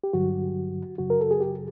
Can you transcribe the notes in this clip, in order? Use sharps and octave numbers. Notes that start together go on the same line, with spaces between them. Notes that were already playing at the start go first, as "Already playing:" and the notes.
G4
G2 D3 F#3 F#4
F#2 C#3 F#3 F#4
A#4
A4
G#4
G4